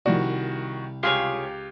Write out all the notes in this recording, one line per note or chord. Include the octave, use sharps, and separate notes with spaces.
C2 D#3 F3 A3 F#4 D5
C#2 F4 G4 G#4 C#5 F5